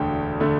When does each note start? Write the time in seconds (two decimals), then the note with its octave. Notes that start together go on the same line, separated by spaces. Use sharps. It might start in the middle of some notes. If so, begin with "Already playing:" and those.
Already playing: E1 D2 D3 A3 G5
0.40 D3 A3